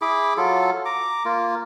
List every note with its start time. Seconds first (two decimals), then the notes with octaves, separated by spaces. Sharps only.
0.02 E4 G#4 B5 D6
0.37 F#3 F4 A4
0.85 A#5 D6
1.25 A#3 F4